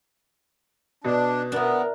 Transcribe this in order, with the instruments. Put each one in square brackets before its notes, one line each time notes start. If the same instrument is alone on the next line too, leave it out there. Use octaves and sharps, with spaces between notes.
[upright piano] B2 [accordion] D4
[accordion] B3 [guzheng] D4 E4 [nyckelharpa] A#4